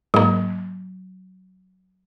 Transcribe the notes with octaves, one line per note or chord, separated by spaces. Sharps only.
G#2 F#3 A#3